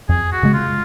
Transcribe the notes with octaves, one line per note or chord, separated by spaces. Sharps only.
F2 G#4
F#4
C#3 G#3
F4